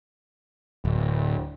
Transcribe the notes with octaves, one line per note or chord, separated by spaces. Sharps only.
D1